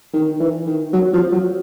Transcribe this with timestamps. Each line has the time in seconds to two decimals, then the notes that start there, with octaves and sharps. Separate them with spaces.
0.13 D#3
0.40 E3
0.66 D#3
0.93 F#3
1.13 F3
1.32 F#3